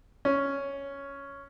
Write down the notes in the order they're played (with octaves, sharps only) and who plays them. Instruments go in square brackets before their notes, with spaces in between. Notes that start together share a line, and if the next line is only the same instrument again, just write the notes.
[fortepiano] C#4